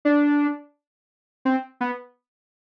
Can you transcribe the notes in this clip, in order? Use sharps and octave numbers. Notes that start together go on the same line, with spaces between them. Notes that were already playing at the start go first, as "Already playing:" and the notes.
D4
C4
B3